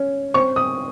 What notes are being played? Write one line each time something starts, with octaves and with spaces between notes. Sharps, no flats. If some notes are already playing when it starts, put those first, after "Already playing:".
Already playing: C#4
C4 C#6
D#6